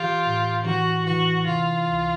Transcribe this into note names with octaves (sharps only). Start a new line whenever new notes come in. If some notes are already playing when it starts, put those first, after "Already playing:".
Already playing: E3 F4 G4
A2
E3 F#4
E3 F#4
C3 F4
C#2